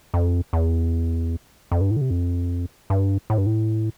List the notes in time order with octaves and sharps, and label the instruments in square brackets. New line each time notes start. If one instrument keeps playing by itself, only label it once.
[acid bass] F2
E2
F2
G2
A2
D3
C3
F2
G2
A2
G2
A2